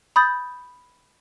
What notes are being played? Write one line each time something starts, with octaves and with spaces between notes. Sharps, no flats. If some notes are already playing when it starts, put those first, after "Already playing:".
B5 D#6 G6 A6